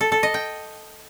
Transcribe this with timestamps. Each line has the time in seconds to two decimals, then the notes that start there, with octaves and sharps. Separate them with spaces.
0.01 A4
0.12 A4
0.23 D#5
0.34 G5